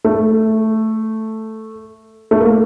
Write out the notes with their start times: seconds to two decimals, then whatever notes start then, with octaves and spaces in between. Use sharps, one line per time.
0.04 A3
2.31 A3
2.40 A#3